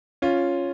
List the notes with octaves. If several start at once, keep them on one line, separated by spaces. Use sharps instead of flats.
C#4 F4